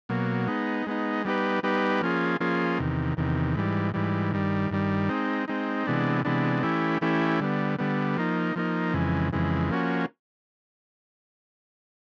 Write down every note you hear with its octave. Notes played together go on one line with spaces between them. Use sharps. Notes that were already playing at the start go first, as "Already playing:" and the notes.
B2 F#3 A#3
G#3 B3 D#4
G#3 B3 D#4
G3 B3 D#4 G4 B4
G3 B3 D#4 G4 B4
F3 A#3 C#4 F4 G#4
F3 A#3 C#4 F4 G#4
E2 C3 D#3
E2 C3 D#3
G#2 E3 G3
G#2 E3 G3
G2 D#3 G3
G2 D#3 G3
G#3 C4 D#4
G#3 C4 D#4
C3 E3 G#3 B3 D4
C3 E3 G#3 B3 D4
E3 A3 C#4 E4 G4
E3 A3 C#4 E4 G4
D3 G3 B3
D3 G3 B3
F3 A#3 D#4
F3 A#3 D#4
F2 C#3 E3 G#3
F2 C#3 E3 G#3
F3 A#3 C#4 F#4